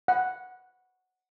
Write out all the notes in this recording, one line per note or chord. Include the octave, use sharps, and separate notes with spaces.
F#5